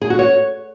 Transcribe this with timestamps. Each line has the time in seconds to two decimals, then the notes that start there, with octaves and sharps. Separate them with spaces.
0.01 G#4
0.10 F#4
0.19 C#5